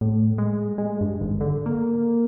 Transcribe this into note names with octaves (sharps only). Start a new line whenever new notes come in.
A2
G#3
G#3
G2
G#1
D3
A#3